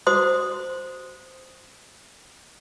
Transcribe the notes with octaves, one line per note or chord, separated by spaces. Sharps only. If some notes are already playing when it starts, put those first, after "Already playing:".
F#4 C5 C6 D#6